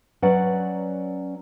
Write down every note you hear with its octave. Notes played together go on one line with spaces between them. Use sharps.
F#3 C#4 B4 D5 F#5